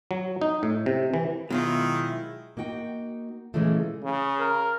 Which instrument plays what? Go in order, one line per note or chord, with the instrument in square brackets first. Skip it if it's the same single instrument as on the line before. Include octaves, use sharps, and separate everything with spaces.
[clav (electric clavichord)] F#3
D#4
A2
C3
E3
[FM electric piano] B2 [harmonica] D#3 [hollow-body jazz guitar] F#3 G#3 F4 [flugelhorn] E4
[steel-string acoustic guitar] A#3 D#4 F#4 G5
A#2 C#3 E3 F#3 G#3 A3
[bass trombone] C#3
[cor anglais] A#4